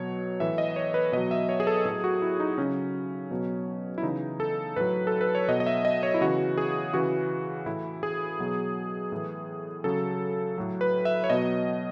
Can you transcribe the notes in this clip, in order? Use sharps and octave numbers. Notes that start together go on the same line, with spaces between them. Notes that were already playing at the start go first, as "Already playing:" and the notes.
Already playing: B2 F#3 C#5
A2 E3 E5
D#5
C#5
B4
B2 F#3 D#5
E5
C#5
G#4
A4
A2 F#3 G#4
F#4
E4
D#4
C#3 F#3 C#4
B2 F#3
E4
C#3 E3 D#4
A4
A2 F#3 B4
A4
B4
C#5
B2 F#3 D#5
D#5
E5
D#5
C#5
E4
C#3 E3 F#4
G#4
C#3 E3 F#4
A2 E3 E4
G#4
B2 F#3
A2 E3
C#3 F#3 A4
A2 F#3
B4
E5
C#5
B2 F#3 D#5